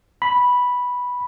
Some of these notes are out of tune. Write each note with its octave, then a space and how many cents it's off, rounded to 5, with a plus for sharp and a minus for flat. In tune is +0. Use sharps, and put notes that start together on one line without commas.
B5 -5